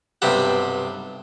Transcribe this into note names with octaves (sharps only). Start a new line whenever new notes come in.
B1 G2 C3 G3 F#5